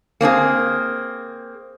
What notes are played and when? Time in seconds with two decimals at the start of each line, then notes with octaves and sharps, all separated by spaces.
0.21 A#3 C4 D4 G#4